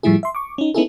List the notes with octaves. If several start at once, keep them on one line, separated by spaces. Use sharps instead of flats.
A2 F3 G3 A3 E4 G#4
E5 C6
C#6 D6
C#4 D#4
B3 C#4 D#4 E4 G#4 A4